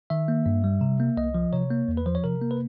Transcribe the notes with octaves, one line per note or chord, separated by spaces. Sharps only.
D#3 E5
A#3
G2
G3
C3
A#3
C2 D#5
F3
C3 C#5
A#3
E2
B4
F3 C5
C#5
C3 A#4
A#3
B4